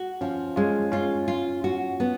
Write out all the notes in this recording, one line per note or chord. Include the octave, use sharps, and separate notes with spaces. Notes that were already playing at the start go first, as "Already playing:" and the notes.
Already playing: F#4
F3 C#4 F4
G#3 C#4 F4
C#4 F4
F4
F#4
B3